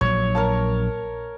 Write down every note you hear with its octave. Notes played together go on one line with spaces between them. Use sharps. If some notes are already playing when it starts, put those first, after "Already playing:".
A#1 F#3 C#5
A#4 C#5 A5